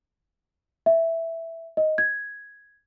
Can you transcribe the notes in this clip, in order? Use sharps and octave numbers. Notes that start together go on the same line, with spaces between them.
E5
D#5
G#6